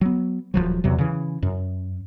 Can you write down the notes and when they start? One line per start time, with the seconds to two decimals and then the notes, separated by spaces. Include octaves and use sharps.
0.01 F#3 B3
0.54 D#1 B1 F3 F#3
0.84 E2 C3 F#3
0.98 C#3 E3
1.43 F#2